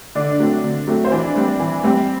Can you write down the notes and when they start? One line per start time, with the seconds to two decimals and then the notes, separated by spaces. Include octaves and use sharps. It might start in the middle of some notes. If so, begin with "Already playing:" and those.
0.15 D3 D4 D5
0.39 F#3 A3 C4
0.64 D3
0.87 F#3 A3 C4
1.05 C5
1.11 E3 D4 D5
1.36 G3 C4
1.59 E3
1.83 G3 C4